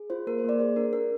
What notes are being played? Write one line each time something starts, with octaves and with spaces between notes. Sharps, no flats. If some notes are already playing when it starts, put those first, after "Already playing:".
Already playing: G#4
F4 C5
A#3 A#4
C5
A#3 D5
G#4 C5
D4 A#4
D4 A#4